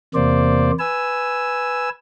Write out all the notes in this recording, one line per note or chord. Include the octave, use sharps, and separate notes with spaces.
E2 C3 A#3 C5 D5
B4 G#5 E6